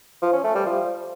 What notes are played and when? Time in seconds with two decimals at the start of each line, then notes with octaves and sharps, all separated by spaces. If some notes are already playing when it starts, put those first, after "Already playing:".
0.22 F3
0.33 C#4
0.44 A3
0.55 G3
0.66 F3